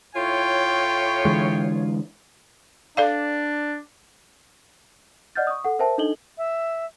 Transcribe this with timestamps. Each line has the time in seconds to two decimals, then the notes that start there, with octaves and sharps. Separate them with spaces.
0.15 A2 F4 C#5 G5
1.25 D3 E3 G#3
2.97 D4 A4 D5 F5
5.35 D5 D#5 F#5 F6 G6 A6
5.47 C#6 D#6
5.64 A4 F#5
5.79 A#4 C5 E5 G5 A5
5.98 D4 D#4 A4 D#5 F#7 G7
6.38 E5